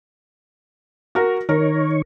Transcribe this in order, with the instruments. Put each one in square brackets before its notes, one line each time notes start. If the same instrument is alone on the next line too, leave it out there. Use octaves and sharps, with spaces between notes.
[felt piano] F#4 A#4
[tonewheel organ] D#3 C#5 [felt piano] A#4